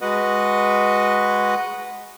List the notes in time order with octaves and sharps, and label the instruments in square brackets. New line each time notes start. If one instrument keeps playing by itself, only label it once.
[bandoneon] G#3 F#4 B4 D#5 F#5